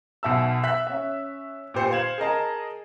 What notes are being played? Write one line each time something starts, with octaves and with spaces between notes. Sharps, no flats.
B1 B2 E5 A5 E6
E5 F#6 B6 F#7
C#4 E5
A#2 G4 C5 C7 C#7
C5 F5 G#6 E7 F#7
G#4 A#4 D#5 A5